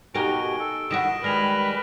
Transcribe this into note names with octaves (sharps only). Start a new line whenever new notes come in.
B2 D#4 F#4 G4 A#4 G#5 D7 G7
A4
D#3 E4 F#4 A#6 D7 E7
D#3 G3 G#3 B4 F6 A#6 F7